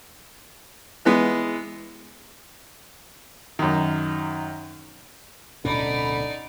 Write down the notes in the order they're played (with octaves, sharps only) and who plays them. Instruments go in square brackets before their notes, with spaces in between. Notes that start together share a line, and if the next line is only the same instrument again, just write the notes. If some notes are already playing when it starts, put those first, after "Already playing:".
[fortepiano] E3 G#3 B3
F#2 D#3
[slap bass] D1 B2 C#4 [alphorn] D3 [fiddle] D#4 D5 [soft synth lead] B5